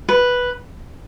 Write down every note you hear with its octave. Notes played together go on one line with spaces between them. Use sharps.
B4